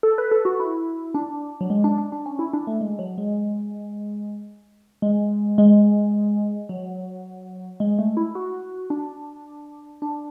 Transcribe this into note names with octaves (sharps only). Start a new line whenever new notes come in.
A4
B4
A4
F#4
E4
D4
F#3
G#3
D4
D4
D4
C#4
E4
D4
A3
G#3
F#3
G#3
G#3
G#3
F#3
G#3
A3
E4
F#4
D4
D4